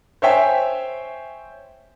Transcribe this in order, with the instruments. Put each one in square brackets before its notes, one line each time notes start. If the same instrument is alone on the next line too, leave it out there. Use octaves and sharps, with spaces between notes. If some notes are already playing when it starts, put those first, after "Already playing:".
[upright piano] C5 C#5 E5 G5 G#5